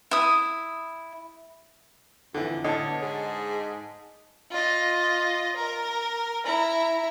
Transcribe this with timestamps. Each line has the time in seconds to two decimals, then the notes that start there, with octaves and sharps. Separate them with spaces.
0.11 E4 D#6
2.34 F2 D3 E3
2.64 A2 D3 C#5 D#5 A5
2.87 B2
3.02 G#2 G#4
4.51 F4 D#5
5.56 A#4
6.45 E4 A#5